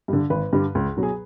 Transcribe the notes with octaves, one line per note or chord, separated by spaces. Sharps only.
G2 D3
G#1 B4
G2 D3
C#2
B2 F#3
G#4